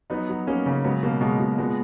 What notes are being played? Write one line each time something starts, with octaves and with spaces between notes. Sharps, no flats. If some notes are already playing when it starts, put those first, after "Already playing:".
F#3 B3 D#4
F#3
F#3 A#3 C#4
C#3
F#3 G#3 B3
B2 A#3
B2 G#3
B2
A#2 G#3 B3